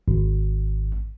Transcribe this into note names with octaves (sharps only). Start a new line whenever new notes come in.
G#1